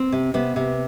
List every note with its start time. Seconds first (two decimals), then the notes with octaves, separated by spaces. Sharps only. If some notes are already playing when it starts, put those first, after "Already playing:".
Already playing: C4
0.12 C3
0.34 C3 B3
0.56 C3